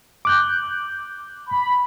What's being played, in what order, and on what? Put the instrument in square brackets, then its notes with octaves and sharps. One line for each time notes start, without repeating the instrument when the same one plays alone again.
[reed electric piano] D6 F#6 G6
[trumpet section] B5